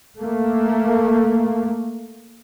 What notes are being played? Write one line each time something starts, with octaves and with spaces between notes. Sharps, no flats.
A3 A#3